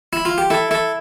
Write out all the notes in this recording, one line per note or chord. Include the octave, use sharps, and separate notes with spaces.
E4
F4
G4
E4 A4
E4 A4